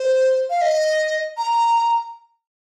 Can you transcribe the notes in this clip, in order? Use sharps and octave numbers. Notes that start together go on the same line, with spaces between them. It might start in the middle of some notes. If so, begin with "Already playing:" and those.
Already playing: C5
F5
D#5
A#5